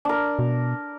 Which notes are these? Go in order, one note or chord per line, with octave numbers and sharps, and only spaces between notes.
D4 A#4
B2